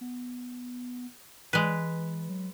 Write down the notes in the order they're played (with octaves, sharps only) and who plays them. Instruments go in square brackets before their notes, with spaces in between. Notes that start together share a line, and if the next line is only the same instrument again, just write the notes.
[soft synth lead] B3
[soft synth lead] E3 [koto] G#3 B4
[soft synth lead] F#3